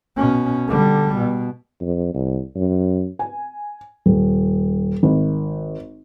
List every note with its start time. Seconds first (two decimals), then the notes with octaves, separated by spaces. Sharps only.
0.17 B2 C#4
0.68 D3 G3
1.16 B2
1.81 F2
2.14 C2
2.55 F#2
3.19 G#5
4.06 D#1
5.03 G#1